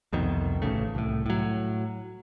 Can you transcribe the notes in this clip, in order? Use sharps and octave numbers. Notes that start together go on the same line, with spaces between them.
C2 F2 B2 D#3
A1 C#3 A3
C2 A2
A2 F#3